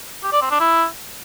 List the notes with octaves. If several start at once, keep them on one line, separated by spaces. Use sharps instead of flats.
G4
D5
C4
D4
E4